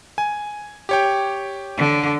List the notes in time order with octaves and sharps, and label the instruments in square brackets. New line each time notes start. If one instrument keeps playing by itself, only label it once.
[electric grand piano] G#5
G4 C#5 G5
[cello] D3